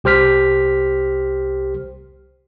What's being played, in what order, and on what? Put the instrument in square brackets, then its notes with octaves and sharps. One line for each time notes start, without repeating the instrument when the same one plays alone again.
[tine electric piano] C2 G4 C5 F6 B6